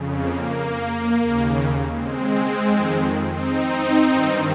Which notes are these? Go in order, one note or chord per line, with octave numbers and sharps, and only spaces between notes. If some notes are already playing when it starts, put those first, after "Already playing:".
Already playing: F2 C#3
A#3
D#2 C#3
G#3 C4
F2 D#3
C4 D#4
G2 D#3